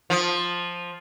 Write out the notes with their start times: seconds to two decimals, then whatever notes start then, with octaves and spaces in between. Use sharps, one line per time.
0.10 F3